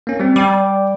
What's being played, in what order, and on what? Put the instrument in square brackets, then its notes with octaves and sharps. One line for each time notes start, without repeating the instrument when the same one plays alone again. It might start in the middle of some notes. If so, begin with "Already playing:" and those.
[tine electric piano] A#3 C#4
G3 C4
[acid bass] G3 [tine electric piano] G5 D6